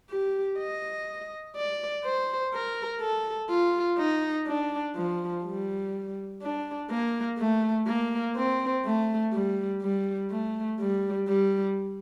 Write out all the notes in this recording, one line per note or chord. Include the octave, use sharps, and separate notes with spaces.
G4
D#5
D5
C5
A#4
A4
F4
D#4
D4
F3
G3
D4
A#3
A3
A#3
C4
A3
G3
G3
A3
G3
G3